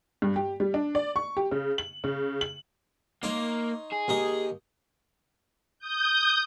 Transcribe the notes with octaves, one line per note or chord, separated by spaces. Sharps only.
G2
G4
G3
D4
D5
C#6
G4
C#3
F#7
C#3
F#7
A#3 D#4 C#5 C6
G#4
D#2 D#4 D#5
D#6 G6